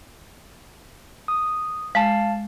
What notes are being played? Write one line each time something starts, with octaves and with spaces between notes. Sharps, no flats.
D#6
G#3 F5 A5